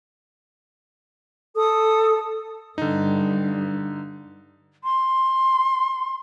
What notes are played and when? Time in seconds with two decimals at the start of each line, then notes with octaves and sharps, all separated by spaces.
1.55 A4 D#6
2.78 G2 D3 D#4
4.84 C6